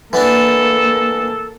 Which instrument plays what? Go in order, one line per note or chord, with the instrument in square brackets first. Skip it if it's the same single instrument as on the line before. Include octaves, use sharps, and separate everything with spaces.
[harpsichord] E3 B3 D4 [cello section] A#3 [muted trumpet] A4